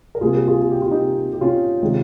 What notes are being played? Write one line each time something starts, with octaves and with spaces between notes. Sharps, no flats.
A#4
C3 G3 A#3 F4 G#4
G4 A#4
F4 G#4
G#4
G4
F4
D#4 G4
G4
C#4 F4
C3 D#3 G#3